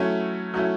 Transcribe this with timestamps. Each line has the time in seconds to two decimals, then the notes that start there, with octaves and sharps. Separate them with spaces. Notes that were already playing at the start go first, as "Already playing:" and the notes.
Already playing: F#3 A3 C#4 E4
0.54 F#3 A3 C#4 E4